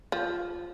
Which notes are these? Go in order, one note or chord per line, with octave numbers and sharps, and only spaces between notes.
F3